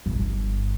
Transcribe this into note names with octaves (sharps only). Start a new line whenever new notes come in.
G1